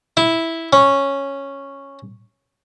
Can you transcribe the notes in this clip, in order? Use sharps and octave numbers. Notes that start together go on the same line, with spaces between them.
E4
C#4